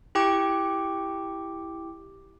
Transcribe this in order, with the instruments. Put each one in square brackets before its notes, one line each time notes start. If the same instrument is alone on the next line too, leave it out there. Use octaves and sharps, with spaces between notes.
[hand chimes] E4 G4 G5 D6